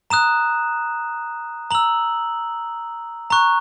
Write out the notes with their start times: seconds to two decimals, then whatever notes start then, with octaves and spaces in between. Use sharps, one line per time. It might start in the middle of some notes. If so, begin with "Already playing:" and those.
0.10 A#5 D#6 F#6 E7
1.71 A#5 E6 F#7
3.30 A#5 C#6 F#6